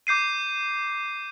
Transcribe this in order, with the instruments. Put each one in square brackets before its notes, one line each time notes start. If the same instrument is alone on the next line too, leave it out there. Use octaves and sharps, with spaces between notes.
[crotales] D6 G6 C7 D#7